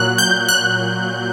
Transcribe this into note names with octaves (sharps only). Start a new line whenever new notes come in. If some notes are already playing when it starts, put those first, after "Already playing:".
Already playing: A#2 F#3 F#6
G6
F#6